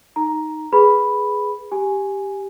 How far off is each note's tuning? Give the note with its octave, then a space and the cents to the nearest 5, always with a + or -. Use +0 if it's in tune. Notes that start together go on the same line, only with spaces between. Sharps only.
D#4 +0 A#5 +5
G#4 +0 B4 +0 B5 +0
G4 +0 G#5 +0